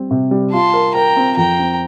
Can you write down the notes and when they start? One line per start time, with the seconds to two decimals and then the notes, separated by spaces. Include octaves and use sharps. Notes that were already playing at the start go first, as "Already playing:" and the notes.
Already playing: G3 C4
0.11 C3
0.31 G3
0.53 F4 A5 C6
0.74 A#4
0.95 A#4 G5 A#5
1.17 C4
1.37 F2 G5 A#5
1.59 C4